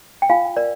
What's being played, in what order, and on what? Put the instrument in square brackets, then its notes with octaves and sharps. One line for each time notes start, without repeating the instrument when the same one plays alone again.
[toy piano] G5
F4 F5 G#5
A#4 D5